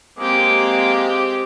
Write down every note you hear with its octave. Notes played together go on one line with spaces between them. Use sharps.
G#3 A#3 C4 G4 D6